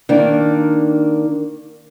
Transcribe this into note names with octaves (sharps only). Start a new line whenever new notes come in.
D#3 A#3 D4